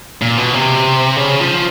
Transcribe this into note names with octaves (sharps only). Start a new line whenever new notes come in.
A#2
B2
C3
C#3
F3